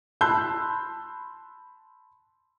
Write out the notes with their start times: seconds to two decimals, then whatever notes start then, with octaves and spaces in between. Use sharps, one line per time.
0.21 A5 B5 C6 E6 F#6 G6